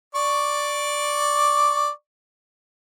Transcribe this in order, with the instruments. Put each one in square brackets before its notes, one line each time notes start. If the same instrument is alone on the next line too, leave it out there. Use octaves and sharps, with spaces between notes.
[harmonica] D5 C#6 D6